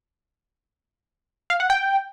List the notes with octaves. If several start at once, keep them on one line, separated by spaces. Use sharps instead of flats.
F5
F#5
G5